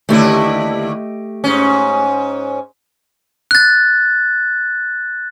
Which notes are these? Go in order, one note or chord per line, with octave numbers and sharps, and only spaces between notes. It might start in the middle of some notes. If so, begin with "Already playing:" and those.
D#2 D3 A3 E4 G4 D#5
G#2 C#4
F#6 A6